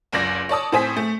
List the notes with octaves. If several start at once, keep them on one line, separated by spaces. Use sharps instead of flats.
F#1 C#2 D5 A#6
C#5 D5 A5 D#6
A2 C4 C5 G#5 D#6 B6
A3